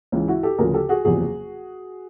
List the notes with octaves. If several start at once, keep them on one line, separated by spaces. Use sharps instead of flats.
C#2 C#3 E3
E4 F#4
G4 A4
D2 C#3 F3 G#4 A#4
G4 A4
F#4 G#4
F#1 E2 C3 F3 F#4 G#4